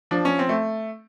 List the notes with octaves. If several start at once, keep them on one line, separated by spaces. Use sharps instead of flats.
F3 D4
C#4
C4
A3